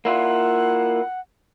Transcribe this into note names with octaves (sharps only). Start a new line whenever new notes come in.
A#3 E4 F4 F#5